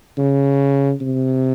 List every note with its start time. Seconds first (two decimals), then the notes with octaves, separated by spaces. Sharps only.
0.18 C#3
1.01 C3